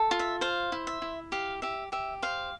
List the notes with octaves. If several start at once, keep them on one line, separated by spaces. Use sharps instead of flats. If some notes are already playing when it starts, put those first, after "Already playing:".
Already playing: A4
F4
E5
C5 F5
E4
E5
E4
G4 F5
G4 E5
G4 E5
C5 F5